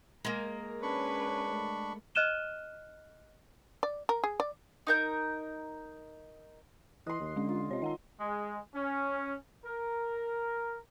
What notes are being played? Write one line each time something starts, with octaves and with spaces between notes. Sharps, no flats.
G#3 A#3 A#4
C#4 D4 B4 C#5 B5 C#6
A3
D#5 F6 F#6 D#7 E7 G7
D5
A#4
G#4
D5
D#4 A#4 G6
E3 D#5 C6 F#6 C7
D#2
D3 G#3 C#4
F4
C3 C#5 D#5
D#3 D#5 F#5 A#5
G#3
C#4
A#4